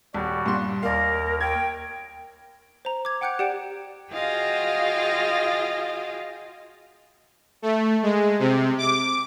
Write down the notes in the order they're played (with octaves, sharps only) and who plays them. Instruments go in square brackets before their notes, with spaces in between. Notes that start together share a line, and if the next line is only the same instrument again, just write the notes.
[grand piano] D#1 [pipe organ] G3 F#4
[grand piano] G2 A#2 C6
[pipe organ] D#2 [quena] A#4 [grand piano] D5 F5
[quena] G5 [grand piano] G#6
[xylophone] C5 A#5
D6 G#6
F#5 G5 D6 F#6 G6 C#7
G4 D5 F#5 G5 G6 E7
[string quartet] F4 F#4 G#4 D#5 F5 G5
[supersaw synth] A3
G#3
C3
D6